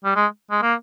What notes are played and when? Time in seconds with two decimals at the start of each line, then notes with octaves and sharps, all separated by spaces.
0.05 G3
0.16 G#3
0.51 G#3
0.62 A#3